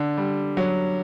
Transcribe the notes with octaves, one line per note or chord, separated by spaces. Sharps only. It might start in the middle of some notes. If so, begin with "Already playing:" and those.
Already playing: D3
G3
F#3